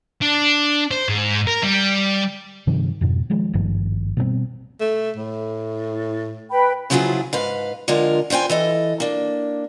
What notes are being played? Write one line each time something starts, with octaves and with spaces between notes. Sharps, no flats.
D4
C5
G#2
A#4
G3
G2 C3 D#3 F3
F2 G#2 B2
D#3 F3 G#3
G#1 G2 D#3 F3
B2 G3 A#3 C4
A3
A2
B4 G5 B5
C#3 F3 F#3 E4 F4 G#4
G#2 B4 F5
D3 F3 G#3 F4 A#4
G2 F4 C5 G5 G#5
E3 A4 D#5
A#3 D4